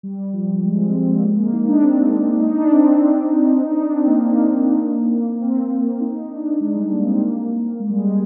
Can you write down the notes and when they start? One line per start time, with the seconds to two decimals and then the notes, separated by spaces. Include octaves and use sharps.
0.03 G3
0.33 F3
0.63 G#3
0.78 C4
0.93 C4
1.08 A#3
1.23 G#3
1.37 A#3
1.53 D#4
1.68 D4
1.82 C4
2.42 D#4
2.57 D4
2.72 C4
2.87 C4
3.02 D4
3.62 D#4
3.77 D4
3.92 C4
4.06 A#3
4.21 A#3
5.41 C4
6.00 D#4
6.31 D4
6.61 G#3
6.75 G3
6.91 A#3
7.05 C4
7.20 A#3
7.80 G#3
7.89 G3
7.99 G#3
8.10 G#3